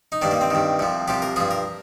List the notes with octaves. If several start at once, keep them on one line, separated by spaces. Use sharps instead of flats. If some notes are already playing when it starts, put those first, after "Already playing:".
D#4
G2 D#3 D4
A#3
C4
G2 D#3
C2 C3 F3
C2 C3 F3 G4
A#4
G2 F3 G#4
A#4